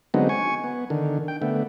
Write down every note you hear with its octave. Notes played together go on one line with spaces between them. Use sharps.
D3 F#3 G#3 B3 C4 D#4
G#5 C#6
B3
D3 D#3
G5
D3 A3 B3